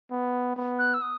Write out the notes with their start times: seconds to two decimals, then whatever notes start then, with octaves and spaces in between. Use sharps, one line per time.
0.11 B3
0.57 B3
0.79 F#6
0.94 E6
1.02 D#6